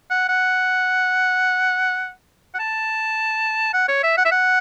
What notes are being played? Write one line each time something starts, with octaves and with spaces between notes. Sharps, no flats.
F#5
F#5
F#5
A5
F#5
C#5
E5
F#5
E5
F#5